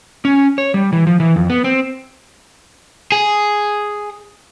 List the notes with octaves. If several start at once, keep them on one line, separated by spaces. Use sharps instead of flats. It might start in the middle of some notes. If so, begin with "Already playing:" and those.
C#4
C#5
G3
E3
F3
E3
F2
B3
C4
G#4